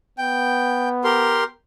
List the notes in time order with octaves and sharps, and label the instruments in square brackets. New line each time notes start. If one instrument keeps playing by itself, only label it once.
[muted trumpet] B3 [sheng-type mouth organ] G5
[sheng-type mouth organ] G4 A#4 C6